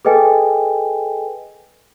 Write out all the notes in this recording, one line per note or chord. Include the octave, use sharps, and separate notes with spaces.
G#4 A4 B4 D#5 G5 G#5